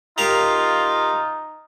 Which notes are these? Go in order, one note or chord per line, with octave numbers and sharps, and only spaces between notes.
D#4 F4 G4 A#4 F5